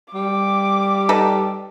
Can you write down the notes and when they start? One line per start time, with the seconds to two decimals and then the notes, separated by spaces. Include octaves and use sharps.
0.14 G3 D6
1.09 D#4 A4 B4